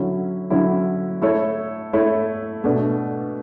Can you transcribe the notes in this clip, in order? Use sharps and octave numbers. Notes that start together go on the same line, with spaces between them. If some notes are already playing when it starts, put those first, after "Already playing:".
Already playing: D3 F#3 C#4 E4
D3 F#3 C#4 E4
A3 E4 A4 C#5
A3 E4 A4 C#5
B2 A3 D4